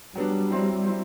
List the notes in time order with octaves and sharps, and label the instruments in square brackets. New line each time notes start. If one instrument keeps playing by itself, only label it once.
[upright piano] F#3 B3 D4 [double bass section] G3
[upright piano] F#3 C4 E4
F#3 C4 E4